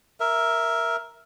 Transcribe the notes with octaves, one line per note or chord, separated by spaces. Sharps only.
A#4 E5